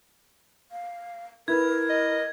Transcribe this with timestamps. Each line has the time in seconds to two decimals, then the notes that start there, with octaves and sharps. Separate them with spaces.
0.72 F5
1.48 E4 A#4 B4 G#6
1.90 D#5